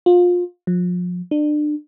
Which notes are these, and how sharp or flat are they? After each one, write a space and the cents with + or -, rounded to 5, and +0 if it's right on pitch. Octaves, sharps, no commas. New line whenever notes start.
F4 +25
F3 +35
D4 +30